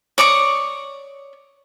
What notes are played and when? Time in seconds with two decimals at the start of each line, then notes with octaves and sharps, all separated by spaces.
0.18 C#5 D5 C#6 D#6